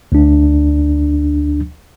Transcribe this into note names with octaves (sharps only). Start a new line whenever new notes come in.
D2 D4